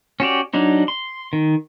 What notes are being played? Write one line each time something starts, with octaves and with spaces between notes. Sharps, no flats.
C#4 F#4 G4 D5
F#3 D4 D#4
C6
D#3